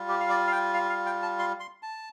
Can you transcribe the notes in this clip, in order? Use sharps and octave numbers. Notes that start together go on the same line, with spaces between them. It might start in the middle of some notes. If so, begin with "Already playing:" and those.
Already playing: G3 F4
G4
F5
D5
F5
G5
F5
F5
G5
A5
C6
C6
A5